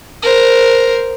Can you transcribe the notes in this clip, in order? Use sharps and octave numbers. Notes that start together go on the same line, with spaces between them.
A#4 C5